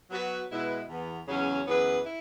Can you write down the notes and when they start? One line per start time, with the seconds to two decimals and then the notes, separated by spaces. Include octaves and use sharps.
0.09 F#3 B3 F#4 B4
0.49 B2 G#3 E4 B4
0.88 E2 E3 B3
1.28 E2 C#3 F#3 C#4
1.67 F#2 E3 B3 G#4 B4
2.06 E4